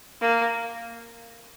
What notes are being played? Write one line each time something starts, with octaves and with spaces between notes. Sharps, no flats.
A#3